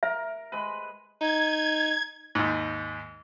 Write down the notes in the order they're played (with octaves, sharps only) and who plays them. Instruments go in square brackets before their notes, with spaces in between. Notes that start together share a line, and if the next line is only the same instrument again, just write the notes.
[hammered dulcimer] A#4 [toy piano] E5
[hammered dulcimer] G#3 B4
[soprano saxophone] D#4 [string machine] G#6
[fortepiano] D#2 G#2